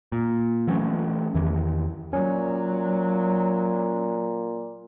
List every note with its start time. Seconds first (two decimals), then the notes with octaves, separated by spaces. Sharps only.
0.12 A#2
0.67 E3 F#3 A3 C#4
1.35 E2 D#3 E3
2.13 A#2 F#3 C#4